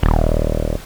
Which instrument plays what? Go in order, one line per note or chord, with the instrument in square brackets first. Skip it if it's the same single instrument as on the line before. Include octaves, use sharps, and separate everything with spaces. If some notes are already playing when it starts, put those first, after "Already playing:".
[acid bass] D#1